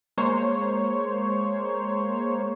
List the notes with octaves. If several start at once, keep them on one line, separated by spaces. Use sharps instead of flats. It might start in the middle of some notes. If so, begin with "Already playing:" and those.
G#3 A#3 C5 C#5